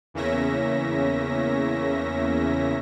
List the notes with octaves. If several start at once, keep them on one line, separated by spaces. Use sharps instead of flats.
E2 C#3 A#3 C#4 E5 A#6